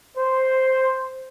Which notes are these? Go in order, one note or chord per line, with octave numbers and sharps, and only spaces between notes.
C5